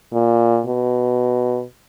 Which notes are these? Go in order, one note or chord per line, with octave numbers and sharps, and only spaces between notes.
A#2
B2